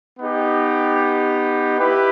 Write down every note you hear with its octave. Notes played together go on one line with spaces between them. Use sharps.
B3 D#4 G4
E4 G4 B4